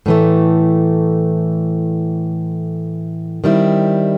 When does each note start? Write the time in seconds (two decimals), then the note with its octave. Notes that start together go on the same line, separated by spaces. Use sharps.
0.06 A2 E3 A3
3.44 D#3 G3 C4 E4